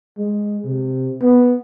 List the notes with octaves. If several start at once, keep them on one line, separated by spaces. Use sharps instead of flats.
G#3
C3
B3